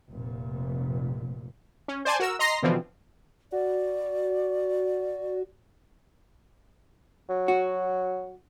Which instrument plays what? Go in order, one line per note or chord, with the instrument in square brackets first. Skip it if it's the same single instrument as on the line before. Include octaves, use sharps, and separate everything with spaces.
[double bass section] F1 A#2
[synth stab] C#4
C5 D5 G#5 A5
F#4 A#4 E6
D#5 A#5 C6 A#6 C7
B2 D3 E3 F3 C4
[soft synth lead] F#4 [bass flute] D5
[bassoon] F#3
[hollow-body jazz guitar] F#4